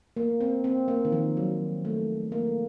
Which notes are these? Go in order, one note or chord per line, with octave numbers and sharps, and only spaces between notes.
A#3
C4
C4
A#3
D#3
F3
F#3
A3
A#3